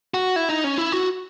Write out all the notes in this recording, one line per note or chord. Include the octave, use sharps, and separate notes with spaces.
F#4
E4
D#4
C#4
E4
F#4